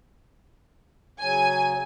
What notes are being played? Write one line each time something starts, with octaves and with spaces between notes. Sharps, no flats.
C#3 F#3 G#5